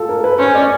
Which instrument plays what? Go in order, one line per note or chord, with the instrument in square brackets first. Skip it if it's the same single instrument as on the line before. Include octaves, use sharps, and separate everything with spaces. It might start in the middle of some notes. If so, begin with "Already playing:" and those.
Already playing: [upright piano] F4 A4
A#4
B4
[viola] C#4 [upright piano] C5
[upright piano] D5